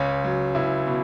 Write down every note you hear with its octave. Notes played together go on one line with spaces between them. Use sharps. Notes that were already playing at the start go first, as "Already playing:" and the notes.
Already playing: C#2 C#4
F#3
C#2 E4
B2